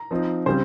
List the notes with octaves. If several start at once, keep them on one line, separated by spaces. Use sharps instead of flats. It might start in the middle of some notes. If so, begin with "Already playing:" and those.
Already playing: A#5
F3 C4 D#4
C#3 G3 C4 C5